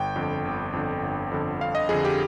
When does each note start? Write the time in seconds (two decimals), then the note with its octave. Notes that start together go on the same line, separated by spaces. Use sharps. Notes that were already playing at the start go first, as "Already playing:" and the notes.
Already playing: G1 G5
0.16 F2 D3
0.45 G1
0.73 F2 D3
1.03 G1
1.32 F2 D3
1.61 G1 F5
1.75 D#5
1.89 F2 G#4
1.94 D3
2.05 G4